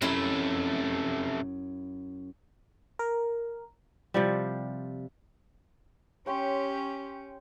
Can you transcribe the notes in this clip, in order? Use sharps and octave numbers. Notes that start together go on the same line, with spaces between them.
F#2 C3 A3 E4 C6
A#4
C3 F3 G3
C#4 G4 C#5 G5 C6